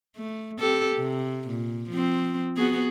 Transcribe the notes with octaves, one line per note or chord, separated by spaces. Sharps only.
A3
C4 G4 A4
C3
A#2
F3 C4
B3 F#4 G#4